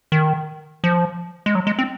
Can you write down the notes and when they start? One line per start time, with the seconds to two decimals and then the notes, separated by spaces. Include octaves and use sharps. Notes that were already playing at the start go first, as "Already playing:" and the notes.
0.12 D#3
0.84 F3
1.46 G#3
1.55 F#3
1.67 G#3
1.79 C4